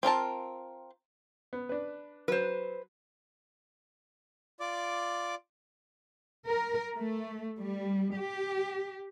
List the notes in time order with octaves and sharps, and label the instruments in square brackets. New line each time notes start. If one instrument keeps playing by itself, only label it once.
[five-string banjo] C4 F4 A#4 A5
[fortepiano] B3
D4 B4
[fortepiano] F#3 [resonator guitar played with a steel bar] B4 C5
[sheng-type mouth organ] F4 D5 D6
[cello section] A#4
A3
G3
G4